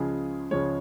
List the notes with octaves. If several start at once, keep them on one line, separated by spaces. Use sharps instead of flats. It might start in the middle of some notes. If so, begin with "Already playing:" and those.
Already playing: C#2 C#3 F3 G#3 G#4
C#2 C#3 F3 G#3 C#5